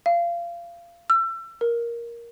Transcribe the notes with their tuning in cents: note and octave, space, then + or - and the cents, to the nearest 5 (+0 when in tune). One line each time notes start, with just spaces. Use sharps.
F5 -25
E6 +30
A#4 +10